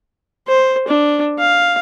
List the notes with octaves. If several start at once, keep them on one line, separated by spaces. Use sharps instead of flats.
C5
D4
F5